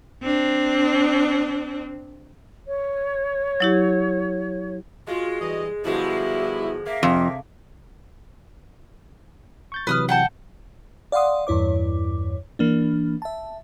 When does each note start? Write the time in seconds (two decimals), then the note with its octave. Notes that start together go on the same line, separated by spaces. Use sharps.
0.22 C4 D4
2.67 C#5
3.60 F#3 E4 G4
5.07 G#3 F4 F#4
5.41 E3 G3 D#5
5.85 D3 F3 G3 G#3 B3 E4 F#4
6.86 A#3 E5
7.03 F2 C3
9.72 C#6 G6 A6
9.87 C3 E3 F#3 B4 D#6 F6
10.09 F#5 G5 A5
11.12 D5 F5 F#5 C6 D#6
11.47 E2 G2 E4 C#5 D6
12.59 E3 A#3 D4
13.22 E5 A5